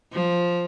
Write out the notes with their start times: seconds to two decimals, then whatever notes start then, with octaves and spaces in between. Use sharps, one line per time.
0.13 F3